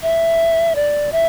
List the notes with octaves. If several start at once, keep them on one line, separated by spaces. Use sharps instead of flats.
E5
D5
E5